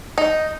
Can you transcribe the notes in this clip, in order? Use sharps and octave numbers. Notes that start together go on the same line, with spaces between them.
D#4